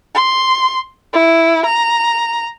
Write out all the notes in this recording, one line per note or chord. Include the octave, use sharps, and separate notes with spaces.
C6
E4
A#5